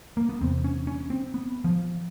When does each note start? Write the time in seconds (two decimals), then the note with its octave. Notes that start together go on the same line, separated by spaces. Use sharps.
0.17 A#3
0.29 B3
0.41 E2 C3 C4
0.64 C#4
0.87 C#4
1.10 C4
1.34 B3
1.64 F3